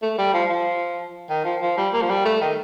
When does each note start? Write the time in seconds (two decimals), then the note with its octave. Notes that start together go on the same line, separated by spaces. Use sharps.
0.02 A3
0.18 G3
0.33 F3
0.50 F3
1.30 D#3
1.45 F3
1.62 F3
1.77 G3
1.93 A#3
2.02 F3
2.10 G3
2.25 A3
2.41 D#3